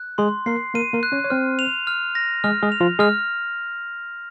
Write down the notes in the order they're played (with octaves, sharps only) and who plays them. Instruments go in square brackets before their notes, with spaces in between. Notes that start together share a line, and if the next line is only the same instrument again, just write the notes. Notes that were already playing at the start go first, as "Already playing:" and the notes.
Already playing: [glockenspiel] F#6
[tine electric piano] G#3 G#4 [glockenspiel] C6
[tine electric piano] A#3 A#4 [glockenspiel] C7
[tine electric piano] A#3 A#4 [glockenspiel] D#7
[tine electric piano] A#3 A#4
[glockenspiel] F#6
[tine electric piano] C#4 C#5
C#5
[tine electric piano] C4 C5 [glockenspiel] F6
[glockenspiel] F7
F6
A#6
[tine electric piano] G#3 G#4 [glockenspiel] F6
[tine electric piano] G#3 G#4
[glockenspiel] F7
[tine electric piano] F3 F4
[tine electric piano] G#3 G#4 [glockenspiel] F6